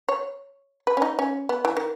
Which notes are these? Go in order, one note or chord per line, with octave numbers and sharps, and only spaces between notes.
C#5
B4
C#4
D#4
C#4
B3
E3
D#3